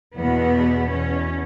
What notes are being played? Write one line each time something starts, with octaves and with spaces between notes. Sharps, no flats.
E2 B2 B3
E2 B2 C#4